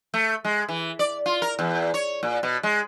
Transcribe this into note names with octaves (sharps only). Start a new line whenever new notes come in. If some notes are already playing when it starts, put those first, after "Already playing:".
A3
G#3
E3
D5
F4
A#4
E2
C#5
A#2
B2
G#3